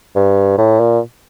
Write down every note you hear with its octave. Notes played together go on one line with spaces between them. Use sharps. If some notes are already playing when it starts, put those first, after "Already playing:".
G2
A2
A#2